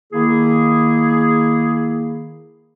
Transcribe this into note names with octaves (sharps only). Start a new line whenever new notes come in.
D#3 A#3 E4 G#4